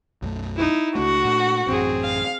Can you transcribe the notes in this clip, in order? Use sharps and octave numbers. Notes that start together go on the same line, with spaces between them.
B1 F#2 A3
D#4 E4
C#2 A3 D4 F#4
A#2 A3
A1 F#2 C4 G#4
F5